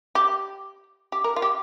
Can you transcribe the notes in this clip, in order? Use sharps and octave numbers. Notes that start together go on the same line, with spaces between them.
G4
G4
A#4
F4
G4